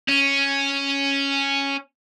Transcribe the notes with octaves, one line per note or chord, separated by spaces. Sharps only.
C#4